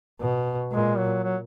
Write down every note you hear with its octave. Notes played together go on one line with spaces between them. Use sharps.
B2
A#2 G#3
F#3
F#3